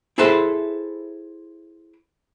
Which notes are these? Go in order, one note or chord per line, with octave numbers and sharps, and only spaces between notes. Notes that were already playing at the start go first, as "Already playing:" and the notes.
E4 G#4 A4 B4 C5 E5